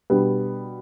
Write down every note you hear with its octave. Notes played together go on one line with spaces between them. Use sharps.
B2 G3 B3 D4